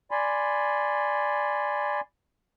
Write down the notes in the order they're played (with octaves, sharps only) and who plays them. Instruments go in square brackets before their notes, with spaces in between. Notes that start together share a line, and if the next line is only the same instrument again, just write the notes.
[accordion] D5 G#5 B5 C6